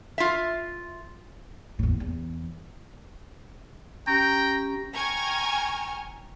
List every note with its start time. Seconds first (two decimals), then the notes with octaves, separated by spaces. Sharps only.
0.18 F4 E5
1.79 E2 A2
2.00 E2
4.07 C#4 G4 G5 A#5
4.94 G5 G#5 A#5 C#6 F6 G#6